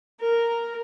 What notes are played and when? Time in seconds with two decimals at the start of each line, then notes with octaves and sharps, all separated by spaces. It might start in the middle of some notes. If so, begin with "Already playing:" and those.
0.21 A#4